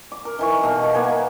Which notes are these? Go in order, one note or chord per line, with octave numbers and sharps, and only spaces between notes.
D6
A#4
D#3 E3 C#6
B2 A4 F5
A#3 B3 G#5